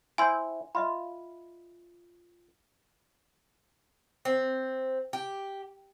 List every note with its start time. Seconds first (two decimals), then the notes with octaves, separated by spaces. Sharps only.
0.18 E4 C5 G5 G#5 C6
0.75 F4 D#5 E5 B5
4.25 C4
5.13 G4